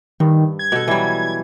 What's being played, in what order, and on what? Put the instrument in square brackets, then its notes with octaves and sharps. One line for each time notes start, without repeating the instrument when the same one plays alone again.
[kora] G2 [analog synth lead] D#3
[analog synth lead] G#6
[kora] B2 A4
E3 F#3 G3